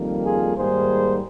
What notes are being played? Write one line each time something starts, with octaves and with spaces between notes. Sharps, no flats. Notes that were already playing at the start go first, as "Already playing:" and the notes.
Already playing: F2 D#3 G3 A#3
F4 G#4
G#2 D#3 G3 A#3 G#4 C5